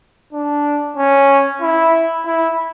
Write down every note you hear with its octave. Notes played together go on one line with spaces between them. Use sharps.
D4
C#4
E4
E4